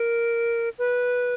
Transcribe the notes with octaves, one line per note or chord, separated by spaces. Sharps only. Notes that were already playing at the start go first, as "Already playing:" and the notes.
Already playing: A#4
B4